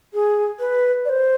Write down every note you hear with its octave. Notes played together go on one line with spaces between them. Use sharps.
G#4
B4
D5
C5